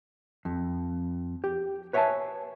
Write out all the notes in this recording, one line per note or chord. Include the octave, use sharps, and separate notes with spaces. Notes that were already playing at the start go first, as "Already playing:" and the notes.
F2
G4
B4 C#5 E5 F#5 G#5 A5